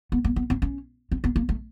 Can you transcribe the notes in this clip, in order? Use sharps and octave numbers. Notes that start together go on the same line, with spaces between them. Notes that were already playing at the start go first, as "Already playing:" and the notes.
B3
A#3
B3
C4
C#4
C4
B3
A#3
A3